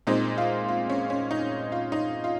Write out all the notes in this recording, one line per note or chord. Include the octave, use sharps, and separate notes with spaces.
A#2 G#3 C4 D#4
F4
F4
C#4
C#4
D#4
F4
D#4
F4